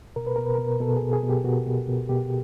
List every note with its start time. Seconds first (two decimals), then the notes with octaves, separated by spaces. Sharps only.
0.16 B2 A#4
0.27 B4
0.36 B2 A#4
0.45 B4
0.55 B2 A#4
0.80 B2 A4
0.97 G#4
1.02 B2
1.13 G#4
1.24 B2
1.30 G4
1.45 B2 F#4
1.66 B2
1.88 B2
2.09 B2 G4